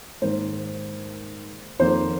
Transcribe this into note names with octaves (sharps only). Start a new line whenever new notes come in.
G#2 D#3 A#3 C5
F2 D#3 A#3 C5